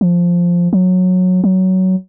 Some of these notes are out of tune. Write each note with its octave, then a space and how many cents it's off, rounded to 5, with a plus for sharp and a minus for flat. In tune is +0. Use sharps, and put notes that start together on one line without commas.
F3 +0
F#3 -15
F#3 +15